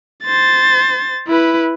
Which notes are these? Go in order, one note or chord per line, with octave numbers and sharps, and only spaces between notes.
C5 A6
E4 B4